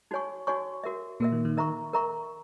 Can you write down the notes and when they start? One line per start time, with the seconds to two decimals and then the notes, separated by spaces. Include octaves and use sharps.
0.11 D#4 F#4 C#5 G#5 C#6
0.47 D#4 F#4 C#5 G#5 C#6
0.83 F#4 A#4 E5
1.20 A#2 A#3 F#4 A#4 E5
1.32 D#3
1.45 D#3
1.57 A#4 E5 A#5 C#6
1.93 A#4 E5 A#5 C#6